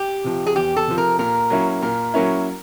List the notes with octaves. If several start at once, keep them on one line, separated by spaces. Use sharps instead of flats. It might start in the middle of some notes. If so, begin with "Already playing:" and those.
Already playing: G4
C3 F3
G#4
E2 G4
A4
C3 F3
A#4
A#2 A#4
F#3 A#3 C#4 E4
A#2 A#4
F#3 A#3 C#4 E4